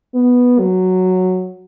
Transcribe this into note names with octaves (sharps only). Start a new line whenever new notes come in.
B3
F#3